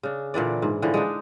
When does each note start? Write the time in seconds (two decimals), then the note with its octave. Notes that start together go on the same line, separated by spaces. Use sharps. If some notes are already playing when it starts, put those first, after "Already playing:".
0.03 C#3 D4
0.34 A#2 D3 E3 D5
0.62 G#2
0.82 A2 D3 E3 F3
0.94 G#3 D4 D#4